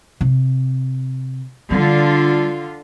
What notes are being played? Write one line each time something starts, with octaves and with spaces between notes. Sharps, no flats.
C3
D3 G3 F4